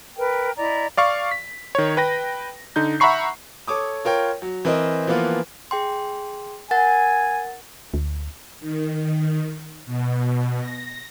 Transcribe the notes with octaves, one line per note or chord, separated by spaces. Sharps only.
A#4 B4 G5
E4 D5 D#5 A#5
D5 F5 C#6
B6
D#3 C#5
B4 G5 A#6
D3 D#4 G6
E5 F#5 A#5 B5 C#6 C7
A4 C#5 D6 D#6
F4 A#4 C#5 G5
F#3
E3 C4 A#4 C5 D#5
E3 F3 A#3 B3 F4
G#4 G5 C6
A#4 F#5 G#5 A6
D2
D#3
B2
A#6